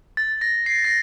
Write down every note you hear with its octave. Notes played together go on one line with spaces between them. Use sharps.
A6
A#6
C7
A#6